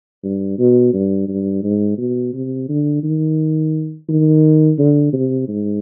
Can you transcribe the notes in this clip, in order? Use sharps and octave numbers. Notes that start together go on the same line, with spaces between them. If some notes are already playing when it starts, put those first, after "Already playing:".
G2
B2
G2
G2
G#2
B2
C3
D3
D#3
D#3
D3
C3
G#2